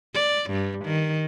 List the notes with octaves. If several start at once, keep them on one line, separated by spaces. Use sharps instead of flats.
D5
G2
D#3